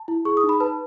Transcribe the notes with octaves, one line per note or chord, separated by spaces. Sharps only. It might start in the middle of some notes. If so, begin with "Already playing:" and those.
Already playing: A5
E4
G#4 C#6
D#6
D#4
B5
B4 A5